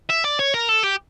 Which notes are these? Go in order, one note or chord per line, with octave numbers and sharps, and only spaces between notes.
E5
D5
C#5
A#4
A4
G4